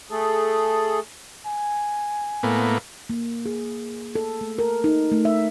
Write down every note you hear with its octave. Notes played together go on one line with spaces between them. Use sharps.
A3 G#4 A4
G#5
A2 A#3 B3
A#3
G#4
A4
A3
A#4
D#4
A3
E5